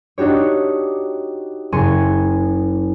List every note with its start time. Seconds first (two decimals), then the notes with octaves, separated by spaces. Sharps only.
0.18 D4 D#4 F#4 G4 C#5
1.72 F#1 G#5 C6 C#6 D#7